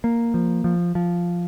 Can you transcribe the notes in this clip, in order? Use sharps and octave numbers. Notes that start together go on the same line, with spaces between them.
A#3
F3
F3
F3